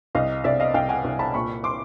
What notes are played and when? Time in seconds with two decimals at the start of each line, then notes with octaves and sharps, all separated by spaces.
0.15 C2 D#5 F5
0.44 C2 D5 E5
0.60 D#5 F5
0.74 C2 F5 G5
0.89 F#5 G#5
1.04 C2
1.19 A5 B5
1.34 A#2 B5 C#6
1.64 C6 D6